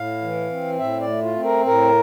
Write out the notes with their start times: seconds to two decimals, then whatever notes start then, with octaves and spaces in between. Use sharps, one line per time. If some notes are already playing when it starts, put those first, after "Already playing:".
Already playing: A2 F5
0.22 E3
0.50 C4
0.79 A2 E5
1.00 D5
1.07 A3
1.22 F4
1.36 C4
1.43 A#4
1.65 A2 A#4